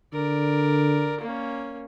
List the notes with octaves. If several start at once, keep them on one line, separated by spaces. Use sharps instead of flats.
D3 A#4 D5
A#3 C#4